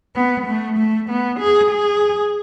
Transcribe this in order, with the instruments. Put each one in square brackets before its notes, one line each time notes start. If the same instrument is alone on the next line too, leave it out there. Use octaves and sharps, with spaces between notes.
[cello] B3
A3
A3
B3
G#4
G#4